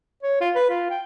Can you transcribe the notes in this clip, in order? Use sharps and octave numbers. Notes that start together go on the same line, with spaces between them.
C#5
F4
B4
F4
G5